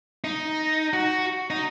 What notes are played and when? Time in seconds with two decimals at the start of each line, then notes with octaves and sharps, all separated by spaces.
0.24 D#4
0.93 F#4
1.50 D#4